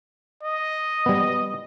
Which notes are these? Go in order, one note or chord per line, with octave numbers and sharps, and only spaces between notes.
D#5
G3 B3